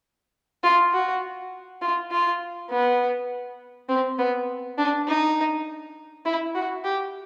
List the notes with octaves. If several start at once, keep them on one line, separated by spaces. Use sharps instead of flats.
F4
F#4
F4
F4
B3
C4
B3
D4
D#4
E4
F#4
G4